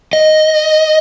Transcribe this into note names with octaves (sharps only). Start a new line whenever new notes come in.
D#5